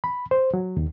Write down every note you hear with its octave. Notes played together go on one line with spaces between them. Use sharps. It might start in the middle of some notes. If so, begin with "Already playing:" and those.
B5
C5
F#3
D#2